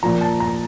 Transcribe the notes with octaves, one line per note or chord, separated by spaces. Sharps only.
A#2 F3 A#5
A5
A#5